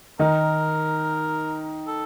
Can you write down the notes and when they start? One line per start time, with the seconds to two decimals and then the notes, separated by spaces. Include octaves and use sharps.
0.19 D#3 D#4 A#4
1.87 A4